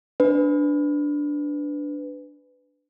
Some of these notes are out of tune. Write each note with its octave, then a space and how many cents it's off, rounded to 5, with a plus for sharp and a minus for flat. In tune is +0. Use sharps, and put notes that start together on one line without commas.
D4 -5 B4 +15